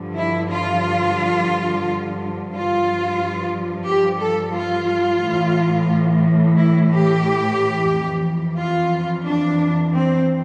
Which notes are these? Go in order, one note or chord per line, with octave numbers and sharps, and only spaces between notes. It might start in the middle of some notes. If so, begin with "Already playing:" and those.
Already playing: G2 D3 F3
E4
F4
G2 F3 F4
G4
A4
F4
A2 E3
E4
G4
F2 E3
F4
D4
C4